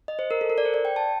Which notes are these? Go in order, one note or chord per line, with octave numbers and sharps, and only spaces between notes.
D#5
C5
A#4
A4
A#4
D5
C5
D5
G5
A5